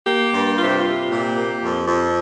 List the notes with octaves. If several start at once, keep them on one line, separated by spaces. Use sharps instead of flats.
A#3 G4
G2
C3 F4
G4
C3 F4
A#2 G4
A#3
F2
F2